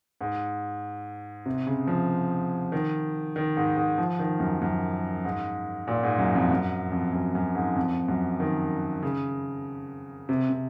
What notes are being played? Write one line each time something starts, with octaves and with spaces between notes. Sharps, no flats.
G#2
C3
C#3
F3
D#3
D#3
G#2
G#2
F3
D#3
F#2
F#2
G#2
A#2
G#2
F#2
F2
F#2
F2
F#2
F#2
G#2
F2
F#2
D#3
C#3
C3
C3